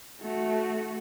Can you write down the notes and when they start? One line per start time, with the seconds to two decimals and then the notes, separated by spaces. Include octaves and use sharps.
0.21 A3 F#4